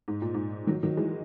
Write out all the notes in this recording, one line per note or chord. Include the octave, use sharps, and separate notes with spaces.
G#2
A#2
G#2
D#3 F#3
D#3 F#3
E3 G#3